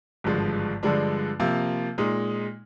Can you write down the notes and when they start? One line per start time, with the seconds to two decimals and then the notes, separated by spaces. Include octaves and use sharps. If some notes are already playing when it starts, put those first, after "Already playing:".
0.24 G#1 G2 D3 F3 G#3
0.83 G2 D3 F3 G#3 D4
1.40 C3 F3 A#3
1.98 A#2 G#3 D#4